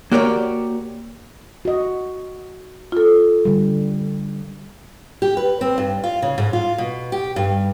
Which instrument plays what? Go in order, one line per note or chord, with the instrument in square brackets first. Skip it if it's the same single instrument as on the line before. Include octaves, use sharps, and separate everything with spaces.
[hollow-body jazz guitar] A#3 F#4 G4 A#4 C#5 D5
[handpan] F#4 D#5
[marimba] F4 A4
[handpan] D3 G3
[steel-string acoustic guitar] G4
B4
C4
G2
F4
C#3
G#2
F4
B2
G4
G2